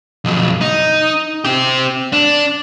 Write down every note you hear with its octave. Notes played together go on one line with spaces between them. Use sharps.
B1 F2
D#4
C4 G4
D4